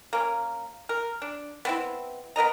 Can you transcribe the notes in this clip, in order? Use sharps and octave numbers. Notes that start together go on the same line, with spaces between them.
A#3 C#4
A#4
D4
B3 C4 E4
B3 A#4 D#5 A#5